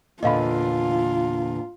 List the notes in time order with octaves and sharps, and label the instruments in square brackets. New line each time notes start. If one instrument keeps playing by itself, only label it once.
[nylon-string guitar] E2 A#2 D3 [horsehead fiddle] F4 [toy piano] D#5 F5 B5